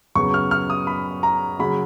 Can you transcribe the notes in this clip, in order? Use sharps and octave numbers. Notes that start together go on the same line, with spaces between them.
F#2 C#3 F#3 B3 C#6
F6
F6
D#6
B5
A#5
C#3 F#3 B5